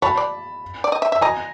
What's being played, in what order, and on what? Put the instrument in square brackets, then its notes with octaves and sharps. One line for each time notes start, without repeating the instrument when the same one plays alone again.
[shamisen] C#5 [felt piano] A5 B5
[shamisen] D5
D5
D#5
E5
E5
[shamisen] D#5 [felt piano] G#5 A#5